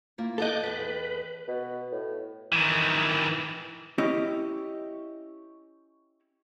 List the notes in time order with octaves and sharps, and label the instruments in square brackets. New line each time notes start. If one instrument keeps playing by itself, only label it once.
[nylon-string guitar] A#3 E4 F4
[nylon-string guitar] B3 F5 A5 [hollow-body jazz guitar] A4 D#5 [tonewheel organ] D6 F#6 G6
[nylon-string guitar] E2 G2 G5 [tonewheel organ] B4
[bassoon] B2
A2
[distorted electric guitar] D#3 E3
[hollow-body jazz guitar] C#4 E4 G4 D#5